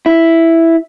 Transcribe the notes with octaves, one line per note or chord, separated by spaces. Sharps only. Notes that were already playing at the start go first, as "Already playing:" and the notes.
E4